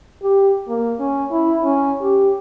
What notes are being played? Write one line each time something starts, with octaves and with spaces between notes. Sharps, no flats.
G4
A#3
C#4
E4
C#4
G4